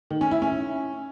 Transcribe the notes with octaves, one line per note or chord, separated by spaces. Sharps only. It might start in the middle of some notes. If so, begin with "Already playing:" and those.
D#3
C#4
E4
C#4